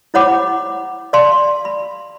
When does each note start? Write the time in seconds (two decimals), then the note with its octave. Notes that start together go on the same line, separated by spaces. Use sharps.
0.14 E4 C5 C#5 F#5 B5 D6
1.13 D5 F5 A5 C6
1.65 B5